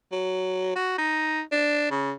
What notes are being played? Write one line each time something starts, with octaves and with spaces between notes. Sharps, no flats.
F#3
F#4
D#4
D4
C#3